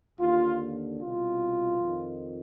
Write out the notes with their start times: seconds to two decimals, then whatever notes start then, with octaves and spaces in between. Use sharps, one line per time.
0.20 D#2 D3 F4
0.99 C2 B2 F4
1.79 F2 D#3